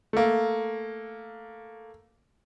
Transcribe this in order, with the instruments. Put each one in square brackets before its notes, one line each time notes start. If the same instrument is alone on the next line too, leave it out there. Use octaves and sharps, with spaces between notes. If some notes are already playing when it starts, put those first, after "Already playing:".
[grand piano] A3 A#3